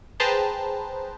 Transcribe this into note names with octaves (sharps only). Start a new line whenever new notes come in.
G#4 B4 C5 G5 A5 A#5